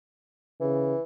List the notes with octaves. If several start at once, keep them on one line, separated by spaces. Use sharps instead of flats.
C#3 E3